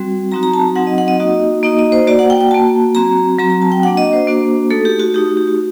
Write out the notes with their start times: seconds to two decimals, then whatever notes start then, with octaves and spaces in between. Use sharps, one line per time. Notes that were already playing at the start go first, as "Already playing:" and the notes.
Already playing: G3 C4 F#4
0.32 F#3 C4 D#4 F#4 A#5
0.43 A#5
0.54 A5
0.76 F#3 C4 D#4 F#4 F#5
0.87 D#5
0.98 F#5
1.08 D#5
1.20 A#3 D#4 F#4
1.63 A#3 D#4 F#4 D#5
1.79 D#5
1.92 C5
2.07 A#3 F#4 D5
2.19 F#5
2.30 G5
2.41 G5
2.51 A#3 F#4 A5
2.95 F#3 C4 F#4 A#5
3.39 F#3 C4 F#4 A#5
3.50 A#5
3.62 A5
3.72 G5
3.83 A#3 D4 F#4 F#5
3.97 D#5
4.13 C5
4.27 A#3 D4 F#4
4.70 A3 D#4 F#4 A4
4.85 G4
5.00 F#4
5.14 A3 D#4 F#4 G4
5.26 F#4
5.37 G4
5.47 F#4